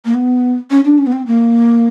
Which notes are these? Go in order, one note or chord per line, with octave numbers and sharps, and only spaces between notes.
A#3
B3
C#4
D4
C#4
B3
C4
A#3